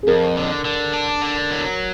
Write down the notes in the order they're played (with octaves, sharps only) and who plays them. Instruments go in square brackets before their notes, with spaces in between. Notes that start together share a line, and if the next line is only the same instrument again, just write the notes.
[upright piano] G#4
[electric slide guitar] F2 [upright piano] A#4
[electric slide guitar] D3
D3
D4
D3
F#3